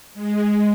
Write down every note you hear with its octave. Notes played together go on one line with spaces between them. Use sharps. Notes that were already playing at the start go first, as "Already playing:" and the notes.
G#3